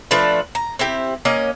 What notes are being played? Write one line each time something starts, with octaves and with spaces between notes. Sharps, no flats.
F3 A3 D4 B4
A#5
C4 E4 G4
A#3 C#4 D#5